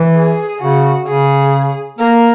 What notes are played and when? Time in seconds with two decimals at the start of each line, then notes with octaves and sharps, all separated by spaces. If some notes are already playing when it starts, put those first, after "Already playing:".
Already playing: E3
0.15 G#4
0.61 C#3 F#4
1.06 C#3 G#4
1.99 A#3 A#4